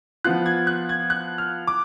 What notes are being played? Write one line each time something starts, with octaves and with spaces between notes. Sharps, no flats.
F3 B3 F4 F#6
G#6
F#6
G#6
F#6
F6
D6